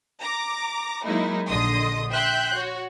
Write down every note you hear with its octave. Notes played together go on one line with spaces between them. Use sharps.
A#5 D6
F#3 G#3 A#3 D#4 E4
A#1 D3 D#5 C6 D#6
E5 G5 C6 F#6 G6
F#4 C#5